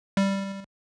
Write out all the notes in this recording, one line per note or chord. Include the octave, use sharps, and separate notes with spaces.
G3